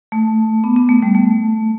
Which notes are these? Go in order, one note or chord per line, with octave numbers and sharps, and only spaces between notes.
A3
B3
B3
A3
G3
A3